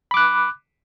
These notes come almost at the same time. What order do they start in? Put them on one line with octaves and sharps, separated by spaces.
B5 D6 F#6